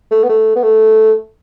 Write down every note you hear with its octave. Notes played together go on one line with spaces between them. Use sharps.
A3
B3
A3
B3
A3